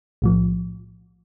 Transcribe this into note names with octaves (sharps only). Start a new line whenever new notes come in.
B1 A2 F3